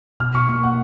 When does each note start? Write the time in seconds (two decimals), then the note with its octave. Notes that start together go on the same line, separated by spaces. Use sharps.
0.20 B2 F6
0.34 B2 C#6
0.49 A#3 C#6
0.63 A#3 F#5